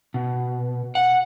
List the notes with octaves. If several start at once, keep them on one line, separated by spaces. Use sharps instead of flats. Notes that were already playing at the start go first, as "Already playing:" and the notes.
B2
F#5